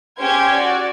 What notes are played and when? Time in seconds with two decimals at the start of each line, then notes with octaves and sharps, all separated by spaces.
0.20 C#4 G4 C5 G#6
0.56 F#4 D5